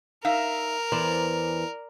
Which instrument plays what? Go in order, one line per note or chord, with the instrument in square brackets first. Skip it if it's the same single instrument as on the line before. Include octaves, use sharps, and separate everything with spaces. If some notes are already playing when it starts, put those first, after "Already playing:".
[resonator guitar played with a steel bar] D#4 E5 F5 [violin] A#4
[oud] E2 E3 C5 [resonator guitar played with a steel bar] D5